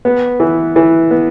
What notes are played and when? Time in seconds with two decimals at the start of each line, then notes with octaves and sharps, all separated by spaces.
0.05 B3
0.40 E3
0.76 E3
1.11 B3